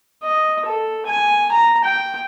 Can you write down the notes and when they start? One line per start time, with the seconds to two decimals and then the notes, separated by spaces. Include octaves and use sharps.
0.24 D#5
0.66 A4
1.06 G#5
1.52 A#5
1.85 G5